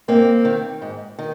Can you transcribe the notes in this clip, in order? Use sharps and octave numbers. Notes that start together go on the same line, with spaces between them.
G#2 A#3 C4
D#3
G#2
D#3